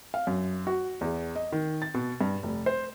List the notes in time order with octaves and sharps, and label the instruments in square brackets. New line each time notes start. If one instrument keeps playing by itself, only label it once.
[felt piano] F5
F#2
F#4
E2
D#5
D#3
A6
B2
G2
F1
C5